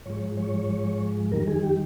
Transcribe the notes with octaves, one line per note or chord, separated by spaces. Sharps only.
G#2 F3 G#3 C#5
C#5
F2 D#3 G3 A#4
G#4
G4